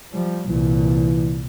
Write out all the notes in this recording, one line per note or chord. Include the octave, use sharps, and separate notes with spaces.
F3 G3
C2 A#2 E3